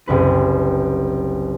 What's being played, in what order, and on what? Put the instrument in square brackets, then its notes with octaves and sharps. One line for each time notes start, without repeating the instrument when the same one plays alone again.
[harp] F#1 C2 B4 D#7